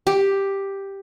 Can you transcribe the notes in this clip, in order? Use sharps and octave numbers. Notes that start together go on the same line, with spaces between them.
G4